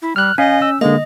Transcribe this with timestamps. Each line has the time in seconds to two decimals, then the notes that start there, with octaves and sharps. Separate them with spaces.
0.02 E4
0.16 G3 F6 F#6
0.38 C#4 D#5 F5 G#5
0.62 E6
0.81 D3 G#3 A#3 D#5